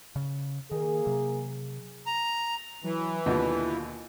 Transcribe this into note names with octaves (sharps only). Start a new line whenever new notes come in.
C#3
D#3 A#3 G#4
C3 F#3
A#5
E3 F#3
D#2 B2 D3 F4